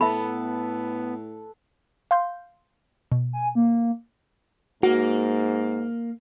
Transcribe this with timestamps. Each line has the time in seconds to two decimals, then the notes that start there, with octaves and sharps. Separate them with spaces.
0.01 A2 B3 A4 B4 E5 A5 B5
2.11 F5 C6 G6
3.12 B2
3.33 G#5
3.55 A#3
4.83 G#2 A#3 F#4